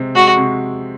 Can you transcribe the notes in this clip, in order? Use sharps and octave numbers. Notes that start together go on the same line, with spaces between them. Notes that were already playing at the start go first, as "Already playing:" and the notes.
Already playing: C3 G#3 C4
G#3 F#4
C3